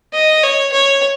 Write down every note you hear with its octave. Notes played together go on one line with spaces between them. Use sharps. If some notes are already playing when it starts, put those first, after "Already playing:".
D#5
C#5
C#5